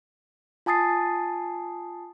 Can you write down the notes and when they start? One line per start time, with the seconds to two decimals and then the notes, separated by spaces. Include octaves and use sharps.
0.66 F4 G#5 A5 D#6 A6 C7